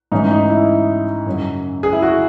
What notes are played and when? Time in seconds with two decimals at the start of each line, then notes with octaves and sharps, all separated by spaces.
0.12 G#2 E3 A3 C#4 D#4
0.31 D#4
0.50 E4
1.26 F#2 C#3 F#3
1.83 G#4
1.93 E4
2.02 F#4